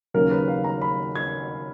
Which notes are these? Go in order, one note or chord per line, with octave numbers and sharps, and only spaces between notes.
D#2 C#3 F#3 A#4
B4
F5
A#5
B5
G#6